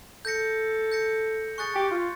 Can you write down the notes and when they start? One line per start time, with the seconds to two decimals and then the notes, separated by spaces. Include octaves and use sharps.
0.25 A4 G6 A#6 C#7
0.92 G6 A#6 C#7
1.58 G#4 C#6 F#6 A6 C#7
1.74 G4
1.91 F4